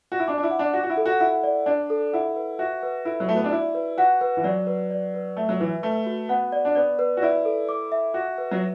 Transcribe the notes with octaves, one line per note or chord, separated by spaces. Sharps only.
F#4
E4
D4 D6
D4
E4
F#5
D4
F#4 F#5
F#4
E4
A4
F#4
E4 F#5
D5
D4 D5
A4
E4 F#5
B4
F#4 E5
B4
E4 A4
F#3
A3 F#4
B3
D4
E4 D5
B4
F#4 F#5
B4
E3
F#3 D5
B4
D5
B4
A3 E5
F#3
E3 B4
A3 B4
F#4
B3 F#5
D5
D4
B3 D5
B4
F#4
E4 D5
A4
D6
E5
F#4 E5
B4
F#3